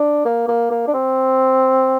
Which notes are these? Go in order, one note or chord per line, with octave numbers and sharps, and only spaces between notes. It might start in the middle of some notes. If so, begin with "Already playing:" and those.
Already playing: D4
A#3
A#3
A#3
D4
C4